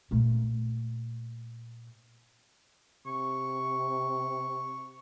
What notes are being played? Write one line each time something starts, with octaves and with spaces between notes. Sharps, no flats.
A#2 A3
C3 C#6